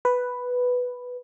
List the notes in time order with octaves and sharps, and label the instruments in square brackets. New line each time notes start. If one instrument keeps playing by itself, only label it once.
[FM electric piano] B4